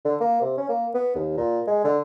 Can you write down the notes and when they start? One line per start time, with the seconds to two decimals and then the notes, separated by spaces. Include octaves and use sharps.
0.05 D3
0.20 A#3
0.41 C3
0.58 C#4
0.69 A#3
0.94 B3
1.15 D#2
1.37 A#2
1.67 G#3
1.85 D3